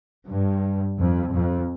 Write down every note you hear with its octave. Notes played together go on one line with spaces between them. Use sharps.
G2
F2
F2